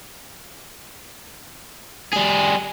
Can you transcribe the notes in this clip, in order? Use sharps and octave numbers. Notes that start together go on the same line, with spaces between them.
G3 G#4